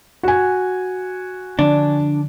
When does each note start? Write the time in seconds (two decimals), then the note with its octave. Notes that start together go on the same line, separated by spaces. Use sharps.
0.23 F#4 G#5
1.59 D3 F3 D4